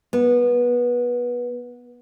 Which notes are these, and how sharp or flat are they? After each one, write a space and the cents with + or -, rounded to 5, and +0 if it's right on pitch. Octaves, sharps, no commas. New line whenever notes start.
B3 -20